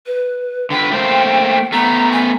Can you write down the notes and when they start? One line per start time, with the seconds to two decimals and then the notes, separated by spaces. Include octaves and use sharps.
0.06 B4
0.70 D3 B4 G5
0.91 A3 A#3 C5
1.72 A3 B3 A#5
2.12 G#5